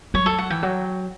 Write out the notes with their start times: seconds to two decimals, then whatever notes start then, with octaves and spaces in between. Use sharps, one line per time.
0.14 F#3 C#5
0.26 A4
0.38 F#5
0.50 E3 G5
0.63 F#3